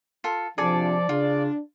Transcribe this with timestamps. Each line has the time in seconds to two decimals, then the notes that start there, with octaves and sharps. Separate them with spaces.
0.24 F4 A4
0.58 C3 F3 D4 F4 G#4 A4 D5
1.09 C#3 D4 F4